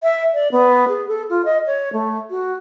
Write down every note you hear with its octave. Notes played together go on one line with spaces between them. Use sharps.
E5
D5
B3
G#4
A4
F4
D#5
C#5
A3
F#4